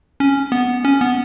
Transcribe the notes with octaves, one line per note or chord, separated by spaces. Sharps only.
C#4
B3
C#4
B3